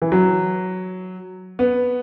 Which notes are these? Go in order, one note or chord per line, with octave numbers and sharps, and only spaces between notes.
E3
F#3
B3